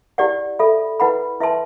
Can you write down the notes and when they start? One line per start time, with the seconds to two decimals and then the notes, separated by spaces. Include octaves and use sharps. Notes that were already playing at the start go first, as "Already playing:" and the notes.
0.18 E4 G4 D5 F#5
0.59 A4 E5 B5
1.00 E4 B4 F#5 B5
1.40 E4 B4 E5 A5 C6